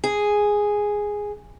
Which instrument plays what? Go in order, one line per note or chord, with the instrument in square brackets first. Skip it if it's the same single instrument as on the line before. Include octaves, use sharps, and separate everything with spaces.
[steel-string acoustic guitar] G#4